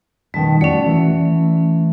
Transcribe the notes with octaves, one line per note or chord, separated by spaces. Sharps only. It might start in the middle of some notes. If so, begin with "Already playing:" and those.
B2 D#3 G3 A5
A3 C#4 F#4 D5
E3